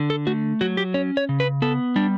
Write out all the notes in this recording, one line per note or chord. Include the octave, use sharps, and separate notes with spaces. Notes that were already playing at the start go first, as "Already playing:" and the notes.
Already playing: D3
A4
A3 F#4
F#3 F#4
G4
C#4 C#5
C#5
C#3
B4
B3 A4
G3 D4